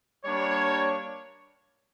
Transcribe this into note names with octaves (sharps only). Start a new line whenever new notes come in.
G3 A#3 D4 C#5